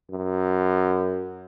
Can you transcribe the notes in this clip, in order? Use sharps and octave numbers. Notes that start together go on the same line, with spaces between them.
F#2